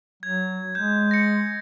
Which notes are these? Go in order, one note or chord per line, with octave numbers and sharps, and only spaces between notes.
F#3 G#6
G#3 G6
A#6 C#7